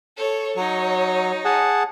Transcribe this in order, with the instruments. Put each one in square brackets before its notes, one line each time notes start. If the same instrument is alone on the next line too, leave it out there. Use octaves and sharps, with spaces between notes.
[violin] A4 C#5
[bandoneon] F#3 [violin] D#4 C#5
[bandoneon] G#4 F#5 A5